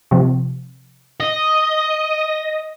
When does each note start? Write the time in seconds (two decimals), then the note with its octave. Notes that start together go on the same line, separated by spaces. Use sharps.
0.11 C3 F3
1.20 D#5